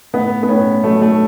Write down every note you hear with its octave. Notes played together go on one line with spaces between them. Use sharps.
A2 B3
B3
A2 C#4
F#3 A3
A3